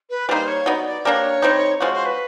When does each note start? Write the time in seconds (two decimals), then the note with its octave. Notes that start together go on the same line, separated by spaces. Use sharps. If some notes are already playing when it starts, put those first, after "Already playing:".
0.10 B4
0.29 G3 A#3 D#4 C5
0.48 C#5
0.66 F#3 B3 D#4 D5
0.86 D5
1.05 A#3 D4 G4 A#4 C#5
1.42 D#3 G3 C4 D#4
1.80 F3 G#3 C#4 F#4 C5
1.93 C5
2.05 B4